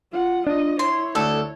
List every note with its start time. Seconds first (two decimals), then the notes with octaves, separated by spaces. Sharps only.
0.11 F4 F#5
0.47 D4 F4 D#5
0.79 E4 C#5 C6
1.15 D2 A4